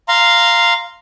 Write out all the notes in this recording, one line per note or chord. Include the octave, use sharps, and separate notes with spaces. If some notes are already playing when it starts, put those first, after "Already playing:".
F5 A#5 C6